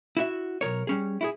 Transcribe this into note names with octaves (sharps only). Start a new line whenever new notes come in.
E4 F#4 E5
B1 A#2 A#4 C#5
G3 C#4 G#4
E4 F#4 G#4